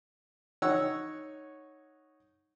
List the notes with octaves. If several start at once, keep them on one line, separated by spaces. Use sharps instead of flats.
D#4 C#5 F#5 E6